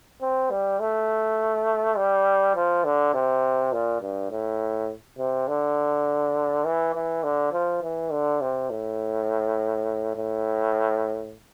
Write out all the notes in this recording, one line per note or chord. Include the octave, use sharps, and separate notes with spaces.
C4
G3
A3
G3
F3
D3
C3
A#2
G2
A2
C3
D3
E3
E3
D3
F3
E3
D3
C3
A2
A2